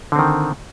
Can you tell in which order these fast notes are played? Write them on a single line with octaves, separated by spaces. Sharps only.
D3 C4 D#3